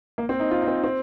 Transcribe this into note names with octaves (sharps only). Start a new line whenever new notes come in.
A#3
C4
D#4
F4
D#4
C4
C4